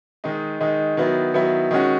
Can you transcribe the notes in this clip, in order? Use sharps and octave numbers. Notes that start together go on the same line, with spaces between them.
D#3 G#3 D#4
D#3 G#3 D#4
D#3 F#3 B3 E4
D#3 F#3 B3 E4
D#3 G#3 C#4 F#4